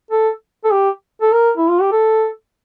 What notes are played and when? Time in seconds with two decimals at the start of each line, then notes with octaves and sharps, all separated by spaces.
0.11 A4
0.64 A4
0.71 G4
1.21 A4
1.32 A#4
1.57 E4
1.70 F4
1.81 G4
1.92 A4